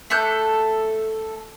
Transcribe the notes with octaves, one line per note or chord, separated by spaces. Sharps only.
A3 A4 F#6 G6